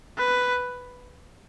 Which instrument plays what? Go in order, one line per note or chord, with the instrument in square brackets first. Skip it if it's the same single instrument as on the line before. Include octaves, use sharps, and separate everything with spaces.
[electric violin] B4